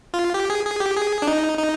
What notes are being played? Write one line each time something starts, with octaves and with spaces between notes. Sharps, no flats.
F4
G4
G#4
G#4
G4
G#4
D4
D#4
D#4